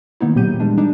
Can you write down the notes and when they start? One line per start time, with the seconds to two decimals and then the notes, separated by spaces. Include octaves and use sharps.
0.21 D#3 A#3 B3 D#4 E4
0.36 A#2 C#3 F#3 G4 G6 D#7
0.60 E3 G3 G#3 D4
0.78 D4 D#4 G#4 D5